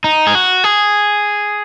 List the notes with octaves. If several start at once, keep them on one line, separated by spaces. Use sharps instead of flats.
D#4
G#4
F#4
G#4